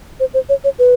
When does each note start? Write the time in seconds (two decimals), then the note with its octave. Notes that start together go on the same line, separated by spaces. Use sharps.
0.20 C5
0.34 C5
0.49 C#5
0.64 C#5
0.79 B4